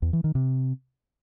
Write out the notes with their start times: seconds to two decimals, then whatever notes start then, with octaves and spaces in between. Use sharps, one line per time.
0.02 E2
0.13 E3
0.24 D#3
0.35 C3